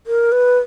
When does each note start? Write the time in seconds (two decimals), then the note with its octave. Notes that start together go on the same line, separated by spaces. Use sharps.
0.07 A#4
0.32 B4